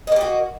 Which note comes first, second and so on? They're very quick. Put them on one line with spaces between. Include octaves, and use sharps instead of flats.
D#5 A#3 G4 F#4